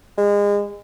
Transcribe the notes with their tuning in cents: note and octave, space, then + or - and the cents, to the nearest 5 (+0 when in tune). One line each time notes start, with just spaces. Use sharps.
G#3 -30